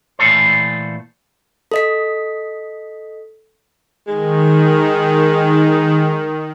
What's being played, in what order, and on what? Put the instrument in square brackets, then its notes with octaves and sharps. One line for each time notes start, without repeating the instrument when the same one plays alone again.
[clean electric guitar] A#2 E3 F#3 A3 A4 C5
[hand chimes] A4 D#5 B6
[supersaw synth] D#3 [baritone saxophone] G#3